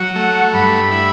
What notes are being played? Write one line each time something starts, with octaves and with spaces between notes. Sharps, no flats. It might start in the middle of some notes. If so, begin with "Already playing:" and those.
Already playing: F#3 F#5
A3
G2 B5
E4